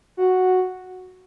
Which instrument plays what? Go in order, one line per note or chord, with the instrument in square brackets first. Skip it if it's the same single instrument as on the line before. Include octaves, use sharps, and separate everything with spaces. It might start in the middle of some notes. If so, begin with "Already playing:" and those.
[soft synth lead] F#4